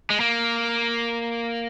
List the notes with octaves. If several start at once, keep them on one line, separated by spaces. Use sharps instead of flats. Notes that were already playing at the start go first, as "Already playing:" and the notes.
G#3
A#3